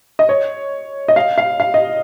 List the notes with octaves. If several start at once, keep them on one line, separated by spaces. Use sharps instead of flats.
D#5
C#5
D#5
F5
F5
F5
D#5